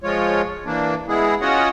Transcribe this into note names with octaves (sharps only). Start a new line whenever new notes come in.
F3 G#3 F4 C#5
E3 A#3 D4
G#3 B3 E4 G#4
C#4 F4 F#4 C#5 D#5 F#5